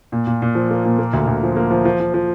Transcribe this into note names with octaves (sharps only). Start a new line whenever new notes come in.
A#2
A#2
A#2
F3
A#3
A#2
A#3
D2
D2
F3
A#3
F3
F3
F3
F3